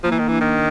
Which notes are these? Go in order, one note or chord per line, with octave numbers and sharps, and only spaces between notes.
F3 A#3
E3
D#3
E3 D4
D#3
A#3